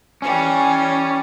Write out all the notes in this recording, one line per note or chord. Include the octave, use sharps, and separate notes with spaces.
E3 G3 C#4